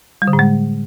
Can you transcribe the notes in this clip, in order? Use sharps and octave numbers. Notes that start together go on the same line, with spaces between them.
G3
D3
A2
G#3